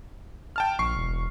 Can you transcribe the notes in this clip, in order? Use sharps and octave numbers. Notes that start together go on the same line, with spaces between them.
G5 A5 F6
A#1 C#6 C7
E1